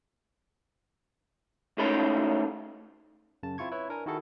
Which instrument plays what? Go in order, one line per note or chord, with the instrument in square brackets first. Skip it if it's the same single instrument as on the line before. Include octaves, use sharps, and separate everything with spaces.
[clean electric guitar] A2 G#3 A3 C#4 D#4 B5
[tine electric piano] F#2 C#3 A5
C4 E4 F4 C#6 G#6
E4 B4 C#5
D4 A#4 G#5
D#3 E4 F#4 G#4 A4